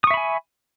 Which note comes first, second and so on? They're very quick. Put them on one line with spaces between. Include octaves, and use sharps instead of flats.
D#6 C#6 E5 B5 G#5